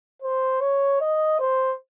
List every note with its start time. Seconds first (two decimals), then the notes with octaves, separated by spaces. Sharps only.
0.22 C5
0.61 C#5
1.01 D#5
1.40 C5